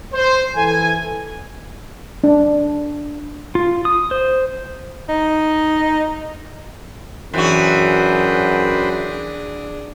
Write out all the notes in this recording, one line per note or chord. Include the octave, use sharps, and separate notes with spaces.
C5
E3 A4 G#5
D4
F4
D#6
C5
D#4
F#2 E3 D4 F#4 G#4 B4 C5 G5